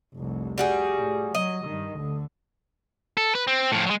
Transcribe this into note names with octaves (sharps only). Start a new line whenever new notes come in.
F1 C2
G3 F#4 G#4
A2
F#3 D#5
G2 D#3
D2 D3
A4
B4
C4
A2 F3
F#3 G#3